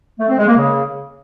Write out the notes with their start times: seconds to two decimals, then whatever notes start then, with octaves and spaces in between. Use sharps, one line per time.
0.19 A3
0.29 C4
0.38 G#3
0.47 A#3
0.57 C#3